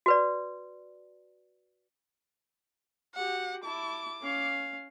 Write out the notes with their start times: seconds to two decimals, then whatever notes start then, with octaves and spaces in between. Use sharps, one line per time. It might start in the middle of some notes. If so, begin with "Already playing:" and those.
0.06 F#4 B4 D5
3.15 F#4 G4 F#5
3.64 E4 A5 D6
4.22 C#4 F5